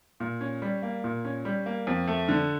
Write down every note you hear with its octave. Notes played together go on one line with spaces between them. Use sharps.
A#2
C#4
G3
A#3
A#2
C#4
G3
A#3
F2
A3
D3